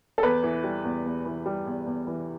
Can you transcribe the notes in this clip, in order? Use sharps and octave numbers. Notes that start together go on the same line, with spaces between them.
A4
E2 B4
E3
G3
E2
E2
E3
G3
E2
E2
E3